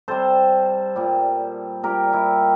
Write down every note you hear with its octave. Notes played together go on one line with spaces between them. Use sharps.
C3 G3 A4 C5
A#2 G3
A#2 G3 G4 A#4
E4 G4